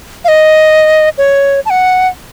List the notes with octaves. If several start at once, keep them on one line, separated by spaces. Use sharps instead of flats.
F5
D#5
C#5
A5
F#5